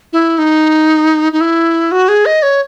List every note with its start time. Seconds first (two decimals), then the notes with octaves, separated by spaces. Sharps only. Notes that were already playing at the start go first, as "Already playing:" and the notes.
0.13 E4
0.38 D#4
1.33 D#4
1.41 E4
1.92 F#4
2.09 G#4
2.26 D#5
2.43 C#5